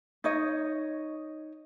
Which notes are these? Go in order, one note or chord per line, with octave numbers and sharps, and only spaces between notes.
D#4 C#5 D#5